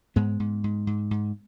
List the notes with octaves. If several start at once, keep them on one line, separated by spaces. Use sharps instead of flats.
G#2 G#3 B3
G#2
G#2
G#2
G#2